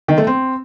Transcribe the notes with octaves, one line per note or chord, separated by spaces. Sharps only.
D#3
A3
C4